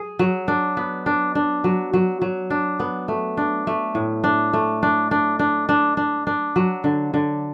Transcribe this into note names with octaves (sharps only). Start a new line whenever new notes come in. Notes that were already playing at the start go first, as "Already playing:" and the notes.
Already playing: G#4
F#3
D4
B3
D4
D4
F#3
F#3
F#3
D4
B3
A3
D4
A3
A2
D4
A3
D4
D4
D4
D4
D4
D4
F#3
D3
D3